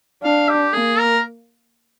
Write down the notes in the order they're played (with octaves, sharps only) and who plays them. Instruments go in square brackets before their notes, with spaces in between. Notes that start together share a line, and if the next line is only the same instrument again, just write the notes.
[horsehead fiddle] D4 [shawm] F5
[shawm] G4
[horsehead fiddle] A#3 [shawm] G#4
[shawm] A#4